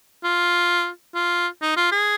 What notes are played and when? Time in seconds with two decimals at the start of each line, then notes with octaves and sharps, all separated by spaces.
0.24 F4
1.15 F4
1.62 D#4
1.77 F4
1.92 G#4